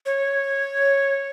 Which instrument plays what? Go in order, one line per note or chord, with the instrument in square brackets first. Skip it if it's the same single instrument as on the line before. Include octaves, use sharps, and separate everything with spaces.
[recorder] C#5